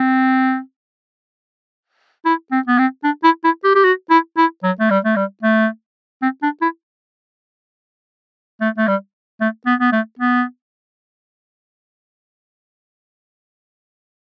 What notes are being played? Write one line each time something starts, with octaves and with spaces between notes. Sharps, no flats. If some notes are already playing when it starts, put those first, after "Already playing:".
Already playing: C4
E4
C4
B3
C4
D4
E4
E4
G4
G4
F#4
E4
E4
F#3
A3
G3
A3
G3
A3
C4
D4
E4
A3
A3
G3
A3
B3
B3
A3
B3